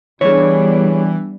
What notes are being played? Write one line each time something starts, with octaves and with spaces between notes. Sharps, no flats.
E3 G3 B3 D4 G#4 C#5